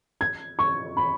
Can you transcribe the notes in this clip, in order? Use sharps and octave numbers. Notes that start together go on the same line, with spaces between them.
G#6
C#6
B5